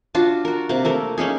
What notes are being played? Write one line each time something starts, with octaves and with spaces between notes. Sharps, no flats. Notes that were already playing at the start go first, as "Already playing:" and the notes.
D4 F4 F#4
F#4 A#4
C3 A#3
A3 A#3 A#4
A#3 C#4 D#4 G#4